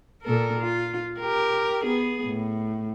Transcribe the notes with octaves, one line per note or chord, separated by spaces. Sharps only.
A#2 A4 A#4
F4
G4 A#4
B3 G#4
A2